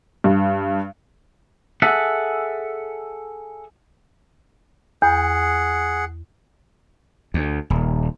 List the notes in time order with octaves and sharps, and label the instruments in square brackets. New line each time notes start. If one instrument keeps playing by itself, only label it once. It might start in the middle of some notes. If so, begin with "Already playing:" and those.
[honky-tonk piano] G2
[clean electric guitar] G#4 A4 E5 F#5
[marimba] E2 [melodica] G#4 F#5
[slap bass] D2
D#1